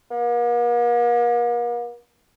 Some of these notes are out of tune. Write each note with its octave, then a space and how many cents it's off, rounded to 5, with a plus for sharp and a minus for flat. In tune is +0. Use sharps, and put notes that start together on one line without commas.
A#3 +45